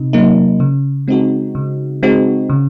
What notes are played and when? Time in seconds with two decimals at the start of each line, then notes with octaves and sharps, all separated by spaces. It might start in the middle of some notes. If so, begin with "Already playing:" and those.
Already playing: C3 D#4
0.13 F#3 A#3 D#4
0.60 C#3
1.08 G#3 C4 D#4 F#4
1.55 C#3
2.03 G#3 C4 D#4 F#4
2.50 C#3